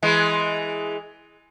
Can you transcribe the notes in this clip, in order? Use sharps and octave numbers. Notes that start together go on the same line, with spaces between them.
E3 G#3